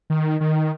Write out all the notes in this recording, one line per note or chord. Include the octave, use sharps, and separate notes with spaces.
D#3
D#3